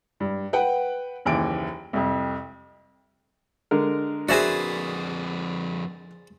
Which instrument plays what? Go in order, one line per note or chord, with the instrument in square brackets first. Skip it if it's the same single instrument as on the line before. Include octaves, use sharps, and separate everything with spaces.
[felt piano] G2
B4 F#5 G5
F#1 D#2 E3 D7
C2 F2
[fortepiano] D3 G#3 A#4
[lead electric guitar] F2 B4 [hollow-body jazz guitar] F#4 E5 G#5 [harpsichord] G#4 C5 D5